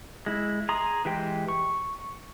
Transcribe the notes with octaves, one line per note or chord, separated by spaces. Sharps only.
G#3 E4
G#4 A#5 C6 D#6
E3 G#3 G4 G5
C#6